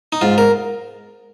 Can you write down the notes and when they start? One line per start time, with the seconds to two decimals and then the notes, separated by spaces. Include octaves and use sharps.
0.12 D#4
0.21 G#2 F4
0.38 A#4